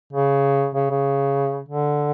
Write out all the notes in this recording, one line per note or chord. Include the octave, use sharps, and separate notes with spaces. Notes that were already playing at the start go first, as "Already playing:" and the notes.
C#3
C#3
C#3
D3